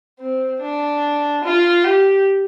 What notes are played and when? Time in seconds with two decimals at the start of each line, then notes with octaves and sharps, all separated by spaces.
0.20 C4
0.61 D4
1.44 F4
1.85 G4